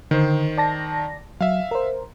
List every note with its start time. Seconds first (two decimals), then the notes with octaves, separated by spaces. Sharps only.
0.11 D3 D#3 C5
0.57 D5 A5 A#6
1.41 F#3 E5 F5
1.71 A#4 C5